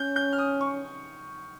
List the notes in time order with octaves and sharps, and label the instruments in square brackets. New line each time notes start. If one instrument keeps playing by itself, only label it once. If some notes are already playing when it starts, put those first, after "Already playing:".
Already playing: [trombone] C#4 [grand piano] G6
[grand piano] G6
F6
D#6
C#6